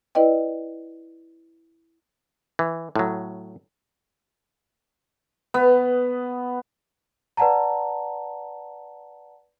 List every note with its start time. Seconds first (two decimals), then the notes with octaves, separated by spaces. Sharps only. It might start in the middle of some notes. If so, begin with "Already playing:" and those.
0.15 E4 B4 D5 D#5 G5
2.59 E3
2.96 A2 F#3
5.54 B3
7.37 B4 D5 F#5 A5 A#5